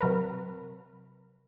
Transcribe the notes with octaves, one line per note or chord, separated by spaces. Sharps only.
C3 F#3 A#4 B4